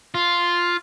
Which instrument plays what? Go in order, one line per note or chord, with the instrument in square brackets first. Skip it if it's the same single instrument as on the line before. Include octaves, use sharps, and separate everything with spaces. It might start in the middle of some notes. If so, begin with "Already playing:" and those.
[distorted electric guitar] F4